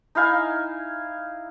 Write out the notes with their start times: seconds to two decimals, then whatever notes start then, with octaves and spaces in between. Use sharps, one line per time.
0.15 D#4 E4 F5 G#5